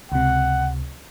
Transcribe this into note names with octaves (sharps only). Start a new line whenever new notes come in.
C#2 C3 F#5